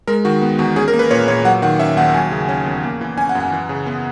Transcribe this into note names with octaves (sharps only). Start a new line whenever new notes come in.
G#3 A#4
D#3 F#4
B3
E2 F#4
C#4 G#4
A#4
A#3
B4
A#2 C#5
A#2 C#5
F#3 F#5
D#3 F#5
C#4 E5
D#2 F#5
F#3 G#5
C#3
C#4
E2
A#3
E3
C#4 G#5
F#5
F#2
F#5
E3
C#3
B3